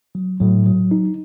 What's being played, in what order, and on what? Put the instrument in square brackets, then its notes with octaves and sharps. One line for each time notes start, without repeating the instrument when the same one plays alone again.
[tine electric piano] F#3
[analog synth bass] A2 [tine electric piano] F#3
[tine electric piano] F#3
D#4